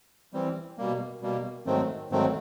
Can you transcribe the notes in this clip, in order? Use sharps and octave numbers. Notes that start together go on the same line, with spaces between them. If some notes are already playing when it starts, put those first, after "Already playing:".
E3 G3 C4
B2 G3 A#3
B2 G3 A#3
G#2 D#3 F#3 A3 C4
G#2 D#3 F#3 A3 C4